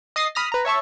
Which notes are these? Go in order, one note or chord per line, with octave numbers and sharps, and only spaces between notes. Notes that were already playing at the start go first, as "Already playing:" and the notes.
D#5 D#6 A6 C7
B5 D#6 F6 A#6
B4 A#5
C#5 E5 A5 C#6